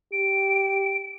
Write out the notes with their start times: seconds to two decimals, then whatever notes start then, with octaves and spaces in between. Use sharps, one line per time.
0.13 G4 D7